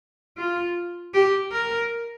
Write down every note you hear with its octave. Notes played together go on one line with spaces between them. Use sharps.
F4
G4
A#4